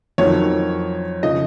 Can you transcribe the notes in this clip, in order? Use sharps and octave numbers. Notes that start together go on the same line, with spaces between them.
F2 D#3 F#3 C#5
C#3 F3 D#5